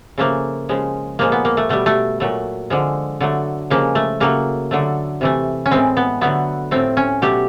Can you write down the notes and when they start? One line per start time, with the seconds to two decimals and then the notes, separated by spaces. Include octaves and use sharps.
0.18 C#3 F3 A3 A#3
0.69 C#3 F3 G#3
1.19 A#2 F3 G#3 A#3
1.32 B3
1.45 A#3
1.57 A3
1.69 B2 G3 A3
1.86 A3
2.20 A#2 F#3 A3
2.70 D3 F3 G#3
3.20 D3 F#3 A3
3.70 C#3 F3 G#3 A#3
3.95 A3
4.20 C#3 F#3 A3 A#3
4.71 D3 F#3 A3
5.21 C3 E3 A3
5.66 C#4
5.71 A2 E3 G#3 C4
5.97 B3
6.21 D3 F#3 A3 B3
6.71 A2 F3 A3 C4
6.97 C#4
7.22 B2 F#3 A3 G4